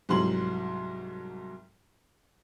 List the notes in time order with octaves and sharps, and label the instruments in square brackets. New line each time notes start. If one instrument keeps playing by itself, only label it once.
[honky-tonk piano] C2 G#2 F#3 C6 F#7